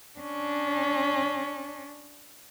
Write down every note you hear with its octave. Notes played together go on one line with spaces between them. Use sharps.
C#4 D4